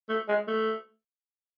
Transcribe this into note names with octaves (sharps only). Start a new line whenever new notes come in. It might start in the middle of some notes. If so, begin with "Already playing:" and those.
A3
G#3
A3